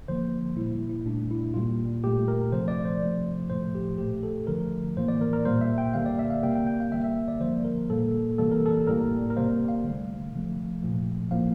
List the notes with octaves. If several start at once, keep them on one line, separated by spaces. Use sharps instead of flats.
D3 F3 A#3 C5
A#2 G3 A#3 E4
E4
A#2 A3 D4
E4
A#2 G3 A#3 F4
A#2 A3 G4
A#4
C3 F3 A3 C5
D5
C5
C3 F3 A3
A2 F3 A3 C5
G4
A#2 A3 G4
A4
D3 F3 A3 A#4
A2 E3 A#3 C5
D5
A#4
A#4
A#2 G3 A#3 C5
E5
G5
D3 G3 A#3 F5
D5
E5
F5
C3 G3 A#3 G5
G5
G5
F5
D3 G3 A#3 E5
E5
D5
D3 F3 A#3 C5
A#4
A#2 G3 A#3 A4
C3 E3 G3 A#3 A4
A#4
A4
A2 G3 A#3 A#4
A#4
C3 G3 A#3 C5
F5
D3 A3
C3 F3 A3
A#2 F3 A3
A2 F3 A#3 F5